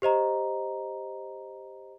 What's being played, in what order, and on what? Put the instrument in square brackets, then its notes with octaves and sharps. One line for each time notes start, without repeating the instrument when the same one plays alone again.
[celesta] G4 C5 D#5 A#5